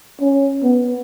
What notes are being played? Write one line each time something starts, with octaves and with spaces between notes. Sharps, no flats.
C#4
B3